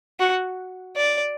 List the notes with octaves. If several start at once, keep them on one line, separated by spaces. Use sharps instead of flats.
F#4
D5